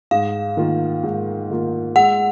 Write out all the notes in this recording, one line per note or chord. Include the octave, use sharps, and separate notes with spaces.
G#2 F5
D#3 A#3 F4
G#2
D#3 A#3 F4
G#3 F#5